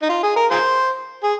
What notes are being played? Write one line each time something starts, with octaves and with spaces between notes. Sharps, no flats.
D#4
F4
G#4
A#4
F4 G#4 C5
G#4